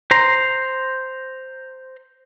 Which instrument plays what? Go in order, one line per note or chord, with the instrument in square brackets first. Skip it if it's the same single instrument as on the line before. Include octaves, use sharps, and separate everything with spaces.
[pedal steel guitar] C5 A#5 C6